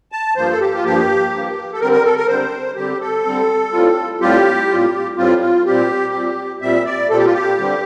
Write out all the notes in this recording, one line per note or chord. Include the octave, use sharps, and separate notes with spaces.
A5
G2 F3 A#3 C5
A4
G4
F4
G2 F3 A#3 G4
G2 F3 A#3
A4
D3 G3 C4 A#4
A#4
A4
A#4
D3 G3 C4 C5
D3 G3 C4 G4
A4
D3 G3 C4
A2 G3 C4 F4
A2 G3 C4 F4 G4
A2 G3 C4 F4
A2 G3 C4 F4
F4
A#2 G3 C4 G4
A#2 G3 C4
A#2 G3 C4 E5
D5
A#2 G3 C4 A4
G4
F4
G4
G2 D3 G3 C4